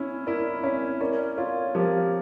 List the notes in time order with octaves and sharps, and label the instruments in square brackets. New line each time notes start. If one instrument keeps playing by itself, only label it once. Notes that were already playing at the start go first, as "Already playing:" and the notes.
Already playing: [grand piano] C#4 E4
[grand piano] E4 [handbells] A#4 D5
[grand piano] C#4 [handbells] C#5 E5
[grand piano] C#4 [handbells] A#4 D5
[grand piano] F4 [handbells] A4 C#5
[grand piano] F3 [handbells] G4 A#4